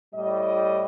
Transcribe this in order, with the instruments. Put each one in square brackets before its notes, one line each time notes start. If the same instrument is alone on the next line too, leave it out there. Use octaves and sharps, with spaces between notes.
[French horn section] A2 G3 D#5